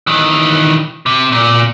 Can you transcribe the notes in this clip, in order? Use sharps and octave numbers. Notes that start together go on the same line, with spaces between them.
D#3 E3
C3
A#2